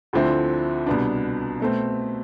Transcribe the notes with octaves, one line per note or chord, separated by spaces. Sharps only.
D2 D3 F3 C4 E4
C2 B2 B3 D4
B2 A3 C4